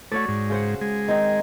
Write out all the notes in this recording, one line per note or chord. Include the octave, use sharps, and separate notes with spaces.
A3 F#4 C#5 D5
G#2
C#3 C5 F#5
G#3
D#3 C4 D#4